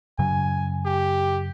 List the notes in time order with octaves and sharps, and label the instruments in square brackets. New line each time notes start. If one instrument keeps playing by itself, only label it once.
[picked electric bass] F#2 C#3 F#3 [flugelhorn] G#5
[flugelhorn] G4